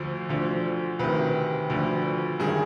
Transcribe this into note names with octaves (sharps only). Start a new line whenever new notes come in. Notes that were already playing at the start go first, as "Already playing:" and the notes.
Already playing: D2 D3 F3 C5
D2 D3 F3
D2 C3 D#3 B4
D2 D3 F3
G2 D#3 G#4